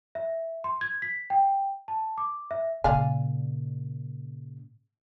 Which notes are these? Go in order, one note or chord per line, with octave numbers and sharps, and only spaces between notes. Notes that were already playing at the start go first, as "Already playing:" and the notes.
E5
C6
G#6
B6
G5
A5
D6
E5
A#2 C#3 D5 F5 G#5